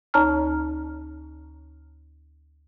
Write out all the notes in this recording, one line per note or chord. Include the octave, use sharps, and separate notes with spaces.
D2 D#4 C#5 A5 A#5 F6